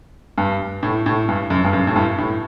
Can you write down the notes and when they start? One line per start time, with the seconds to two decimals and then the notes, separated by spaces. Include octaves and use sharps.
0.38 G2
0.83 A2
1.06 A2
1.28 G2
1.50 F#2
1.64 G2
1.73 F#2
1.87 A2
1.96 G2
2.18 A2